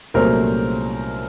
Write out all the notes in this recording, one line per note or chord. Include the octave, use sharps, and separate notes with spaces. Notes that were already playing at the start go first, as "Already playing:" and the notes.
C2 A#2 F#3 A3 C#4 A#4 C5